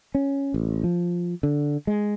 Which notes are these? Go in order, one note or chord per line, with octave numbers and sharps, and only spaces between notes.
C#4
A1
F3
D3
G#3